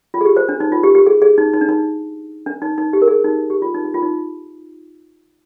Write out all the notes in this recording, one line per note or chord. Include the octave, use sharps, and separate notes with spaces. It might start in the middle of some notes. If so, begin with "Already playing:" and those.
F4
G#4
G4
C5
D4
D#4
F4
G4
G4
G#4
G#4
D#4
D#4
D4
D#4
D4
D#4
D#4
G4
A#4
G#4
D#4
G4
F4
D#4
D#4
F4
D#4